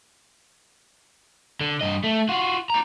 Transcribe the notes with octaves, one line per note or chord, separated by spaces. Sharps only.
D3
G2 D#5
A3
F4 F#4
D4 A#5